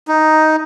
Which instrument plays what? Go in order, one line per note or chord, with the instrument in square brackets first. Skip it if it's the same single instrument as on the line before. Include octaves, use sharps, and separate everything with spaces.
[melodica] D#4